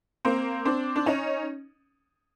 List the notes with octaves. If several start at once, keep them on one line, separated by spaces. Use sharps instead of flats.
A#3 C4
C4 D4
D4
C#4 D#4